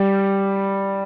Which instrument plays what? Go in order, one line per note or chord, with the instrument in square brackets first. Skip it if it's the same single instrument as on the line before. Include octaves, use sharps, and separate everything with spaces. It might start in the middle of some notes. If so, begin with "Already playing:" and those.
Already playing: [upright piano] G3